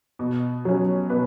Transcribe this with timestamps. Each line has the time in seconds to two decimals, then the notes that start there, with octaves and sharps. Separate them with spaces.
0.19 B2
0.65 F#3 C#4
1.10 B2 B4